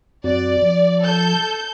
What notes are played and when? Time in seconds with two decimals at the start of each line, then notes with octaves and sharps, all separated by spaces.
0.24 F#2 C4 F#4 D5
0.62 F3
1.03 A4 G6